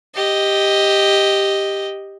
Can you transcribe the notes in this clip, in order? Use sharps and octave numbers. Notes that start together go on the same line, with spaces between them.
G4 D#5